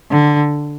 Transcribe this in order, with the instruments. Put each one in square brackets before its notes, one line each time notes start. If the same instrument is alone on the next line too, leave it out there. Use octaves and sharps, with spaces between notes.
[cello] D3